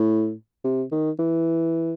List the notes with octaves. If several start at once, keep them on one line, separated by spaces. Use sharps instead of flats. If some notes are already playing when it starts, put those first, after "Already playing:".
Already playing: A2
C3
D#3
E3